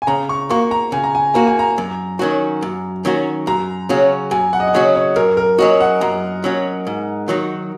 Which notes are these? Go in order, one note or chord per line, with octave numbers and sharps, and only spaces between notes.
G#5
C#3 A#5
C#6
A#3 F#4 C#6
A#5
C#3 G#5
A#5
G#5
A#3 F#4 A#5
G#5
A#5
F#2
D#3 F#3 C#4 F#4
F#2
D#3 F#3 C#4 F#4
F#2 A#5
C#3 F#3 C#4 F#4
F#2 G#5
F#5
D#5
F#5
C#3 F#3 C#4 F#4 D#5
C#5
F#2 A#4
A#4
F#3 C#4 F#4 D#5
F#5
F#2 A#5
F#3 C#4 F#4
G#2
D#3 F#3 D#4 F#4